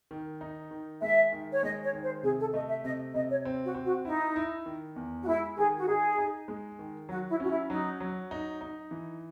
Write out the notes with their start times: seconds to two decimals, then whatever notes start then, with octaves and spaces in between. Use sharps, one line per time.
0.11 D#3
0.41 D#4
0.71 D#3
1.02 G#3 E5
1.32 D#3
1.52 C#5
1.63 G#3 D#5
1.83 C#5
1.93 D#3
2.03 C5
2.23 C3 G#4
2.39 A4
2.54 A3 D#5
2.68 E5
2.84 C3 D#5
3.14 C3 D#5
3.30 C#5
3.45 C4
3.65 F#4
3.75 C4
3.85 F#4
4.05 D#4 E4
4.36 E4
4.66 D#3
4.96 E2
5.23 F#4
5.27 G#3 E4
5.57 D#3 G#4
5.77 F#4
5.87 D#4 G#4
6.18 D#4
6.48 G#3
6.79 D#3
7.09 F#3 F#4
7.29 E4
7.40 C#4 F#4
7.50 E4
7.70 F#3 D#4
8.00 F#3
8.31 D#4
8.61 D#4
8.91 E3